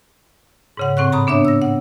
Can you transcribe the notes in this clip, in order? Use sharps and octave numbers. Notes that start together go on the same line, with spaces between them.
G#2 C#3 F#5
A2 C4 F#5 C#6 F#6
A#5 B5 D#6
B3 D4 C#5 E5
E6 A#6
F#5